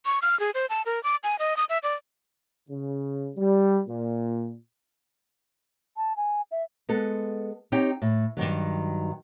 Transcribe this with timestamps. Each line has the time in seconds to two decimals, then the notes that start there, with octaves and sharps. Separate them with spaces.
0.06 C#6
0.22 F6
0.40 G#4
0.54 C5
0.70 A5
0.86 A#4
1.04 D6
1.24 G#5
1.39 D#5
1.57 D#6
1.69 E5
1.83 D5
2.69 C#3
3.37 G3
3.88 A#2
5.97 A5
6.17 G#5
6.51 E5
6.89 G#3 B3 A4
7.72 C4 D#4 G4 C#5 G5
8.02 A2
8.37 G2 A#2 D#3 F#3